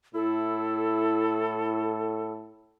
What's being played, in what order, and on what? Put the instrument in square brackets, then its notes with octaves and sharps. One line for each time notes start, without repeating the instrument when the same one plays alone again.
[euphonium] A2 [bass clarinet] E4 [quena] A4